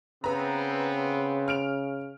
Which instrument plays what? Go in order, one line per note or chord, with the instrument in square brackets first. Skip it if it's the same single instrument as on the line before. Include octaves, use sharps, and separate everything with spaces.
[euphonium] C#3 [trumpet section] B3 C4 [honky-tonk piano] B4 A#5
[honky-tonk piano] F6 D7 F7